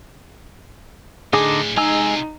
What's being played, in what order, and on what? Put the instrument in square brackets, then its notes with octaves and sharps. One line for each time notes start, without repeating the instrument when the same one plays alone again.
[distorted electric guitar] A2 D4 [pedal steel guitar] D3 D#4 D6 [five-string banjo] G#4
[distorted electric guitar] C3 F4 [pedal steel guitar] G#3 G#5 E6 [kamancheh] D#4